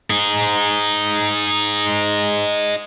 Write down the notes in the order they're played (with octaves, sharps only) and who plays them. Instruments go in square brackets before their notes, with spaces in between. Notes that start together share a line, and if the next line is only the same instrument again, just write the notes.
[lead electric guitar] D#4 G#4